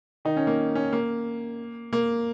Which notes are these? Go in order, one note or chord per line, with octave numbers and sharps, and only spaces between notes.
D#3 D#4
C#4
A#3
C#4
A#3
A#3